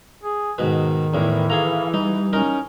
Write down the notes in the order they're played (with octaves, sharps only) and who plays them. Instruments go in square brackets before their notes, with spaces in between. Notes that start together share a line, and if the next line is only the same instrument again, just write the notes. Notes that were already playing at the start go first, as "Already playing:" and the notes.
[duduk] G#4
[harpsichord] G#2 B2 B4 [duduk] D#3
[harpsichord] E2 A2 [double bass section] E3
[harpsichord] G#4 A4 A#5 [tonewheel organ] F5
[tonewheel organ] G3 [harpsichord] D#4
[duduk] C#4 [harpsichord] D#4 A#4